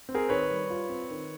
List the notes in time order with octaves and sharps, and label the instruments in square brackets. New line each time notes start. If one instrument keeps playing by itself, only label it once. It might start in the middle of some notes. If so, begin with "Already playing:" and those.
[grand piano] C4
G#4 A#4
D#3 B4 C#5
G3
F4
C4
D#3